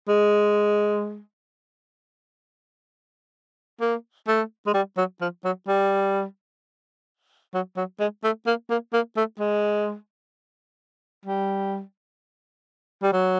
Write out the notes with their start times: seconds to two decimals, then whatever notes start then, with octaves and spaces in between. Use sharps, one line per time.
0.08 G#3
3.81 A#3
4.27 A3
4.66 G#3
4.74 G3
4.97 F#3
5.21 F3
5.44 F#3
5.67 G3
7.54 F#3
7.76 F#3
7.99 G#3
8.24 A3
8.46 A#3
8.70 A#3
8.93 A#3
9.16 A3
9.39 G#3
11.25 G3
13.03 G3
13.12 F#3